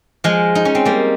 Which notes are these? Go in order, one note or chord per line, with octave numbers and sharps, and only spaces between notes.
F3 G#3
D#4
C#4
C4
G3 A#3